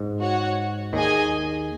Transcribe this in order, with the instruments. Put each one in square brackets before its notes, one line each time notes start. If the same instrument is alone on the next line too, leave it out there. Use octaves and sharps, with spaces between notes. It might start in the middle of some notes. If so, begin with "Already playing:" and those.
Already playing: [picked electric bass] G#2
[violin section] F#4 C#5 F#5
[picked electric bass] D#2 D#3 [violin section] G#4 D#5 G#5